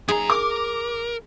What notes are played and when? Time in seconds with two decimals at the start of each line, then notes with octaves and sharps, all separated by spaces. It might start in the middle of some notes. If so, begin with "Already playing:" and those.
0.08 F#2 G#4 A#5
0.30 A#4 D6